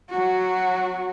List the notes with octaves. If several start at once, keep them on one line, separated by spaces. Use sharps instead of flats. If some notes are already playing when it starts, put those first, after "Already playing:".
F#3 F#4